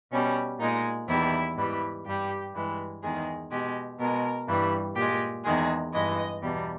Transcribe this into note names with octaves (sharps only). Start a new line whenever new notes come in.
B2 G3 C#4
A#2 G#3 D#4
E2 D#3 G3 E4
G#2 E3 G3
G2 G3 G4
G2 E3 G#3
E2 D#3 G#3 G#4
B2 G#3 G4
B2 G#3 A#4
G2 E3 G3
A#2 G#3 G4
E2 D#3 G#3 G#4
G2 E3 G#3 D#5
E2 B2 G3